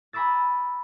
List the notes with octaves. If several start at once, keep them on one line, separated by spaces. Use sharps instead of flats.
G#5 A#5 B5 D6 E6 A6